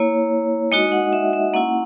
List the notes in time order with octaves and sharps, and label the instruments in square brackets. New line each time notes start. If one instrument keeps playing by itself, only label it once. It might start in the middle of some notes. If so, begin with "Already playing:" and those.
Already playing: [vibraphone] A#3 E4 C#5
G#3 D#4 F#4 D#5
F#5
E5
E5
A#3 C#4 E4 F#5